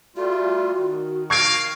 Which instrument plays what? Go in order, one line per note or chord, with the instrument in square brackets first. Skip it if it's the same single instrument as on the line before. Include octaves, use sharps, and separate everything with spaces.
[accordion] G3 A3 F4 [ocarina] F#4
[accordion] D#3
[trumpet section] A#3 F5 [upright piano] C#6 G#6 D7